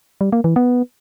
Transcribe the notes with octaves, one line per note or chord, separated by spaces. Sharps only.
G3
A#3
E3
B3